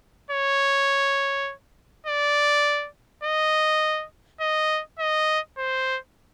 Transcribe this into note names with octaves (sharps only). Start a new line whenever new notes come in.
C#5
D5
D#5
D#5
D#5
C5